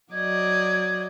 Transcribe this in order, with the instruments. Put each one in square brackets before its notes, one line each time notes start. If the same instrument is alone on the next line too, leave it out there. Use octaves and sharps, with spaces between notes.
[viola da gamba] F#3 D5 D#5 [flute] G#6